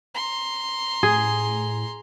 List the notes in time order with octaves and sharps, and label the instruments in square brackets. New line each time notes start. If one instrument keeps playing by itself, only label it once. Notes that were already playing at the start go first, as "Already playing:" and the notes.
[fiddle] A#5 C6
[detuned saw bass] A2 [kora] G#4